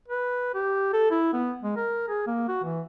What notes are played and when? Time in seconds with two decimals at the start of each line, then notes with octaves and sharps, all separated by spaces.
0.08 B4
0.54 G4
0.93 A4
1.11 E4
1.33 B3
1.63 G#3
1.77 A#4
2.08 G#4
2.27 A#3
2.49 F#4
2.64 E3